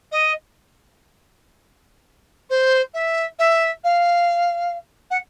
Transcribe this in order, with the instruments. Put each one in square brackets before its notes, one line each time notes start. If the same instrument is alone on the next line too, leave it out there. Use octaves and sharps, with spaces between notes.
[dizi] D#5
C5
E5
E5
F5
F#5